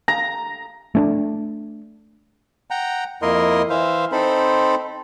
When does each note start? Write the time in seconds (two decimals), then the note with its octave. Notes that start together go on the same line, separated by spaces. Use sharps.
0.08 A#5
0.95 A3 C#4 D4
2.71 F#5 G5 A#5
3.22 F2 A#3 E4 A#4 D#5 C6
3.70 E3 C5 E5 F5
4.12 C4 D#4 A4 C5 B5